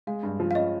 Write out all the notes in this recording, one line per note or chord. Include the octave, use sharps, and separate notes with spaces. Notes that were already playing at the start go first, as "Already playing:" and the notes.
G#3 F5
G2
F3
F5
C#4 D#5